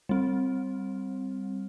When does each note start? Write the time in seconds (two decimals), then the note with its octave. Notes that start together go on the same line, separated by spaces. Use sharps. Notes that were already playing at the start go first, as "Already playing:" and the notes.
0.09 G3 C4